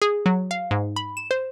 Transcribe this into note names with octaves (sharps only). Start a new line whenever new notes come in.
G#4
F#3
F5
G#2
B5
E7
C5